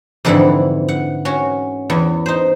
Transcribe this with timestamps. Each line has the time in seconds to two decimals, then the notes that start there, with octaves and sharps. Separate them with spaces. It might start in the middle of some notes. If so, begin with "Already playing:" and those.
0.25 F2 G#2 D3 E3 F#5 B5
0.88 F#5
1.25 C#4 F#4
1.90 E2
2.26 D#4 C5